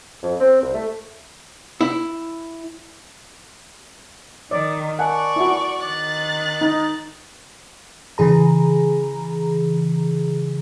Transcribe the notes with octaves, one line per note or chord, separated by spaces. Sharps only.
F2
C4
C2
A3
E4
D#3 D5
A#4 D5 F#5 G#5 A5 C#6
E4 F#4
D#3 D6 F#6 A6
D#4
C#3 E3 G#4 A#5